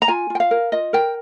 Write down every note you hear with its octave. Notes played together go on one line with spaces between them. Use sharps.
A#5
F4 G#5
F4 G5
F5
A#4
F4 D#5
A#4 G5